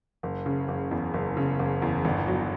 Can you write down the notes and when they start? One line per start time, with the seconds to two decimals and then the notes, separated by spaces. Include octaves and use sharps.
0.23 F#1
0.46 C#3
0.68 F#1
0.91 E2
1.14 F#1
1.37 C#3
1.59 F#1
1.82 E2
2.05 G1
2.28 F#3